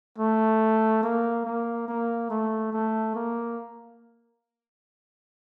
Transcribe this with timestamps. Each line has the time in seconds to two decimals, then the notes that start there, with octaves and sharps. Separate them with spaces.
0.18 A3
1.03 A#3
1.45 A#3
1.88 A#3
2.30 A3
2.72 A3
3.15 A#3